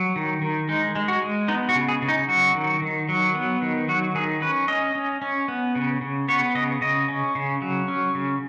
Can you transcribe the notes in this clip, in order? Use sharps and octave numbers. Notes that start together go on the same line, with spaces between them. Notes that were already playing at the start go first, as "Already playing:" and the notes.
Already playing: F#3
D#3
D#3
G#3 D#4
G#3
F#4
G#3
B3 D#4
F#4
C#3
G#4
C#3
D#4
F#3 F#4
D#3
D#3
F#3
B3
D#3
F#3 F#4
D#3 G#4
C#4 B4
C#4 D#5
C#4
C#4
B3
C#3
C#3
B3 C#5
C#3 D#5
C#3 D#5
C#4
C#3
F#3
C#4
C#3